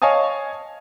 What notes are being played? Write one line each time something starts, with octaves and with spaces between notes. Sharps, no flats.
C#5 D#5 F5 G#5 A5 D#6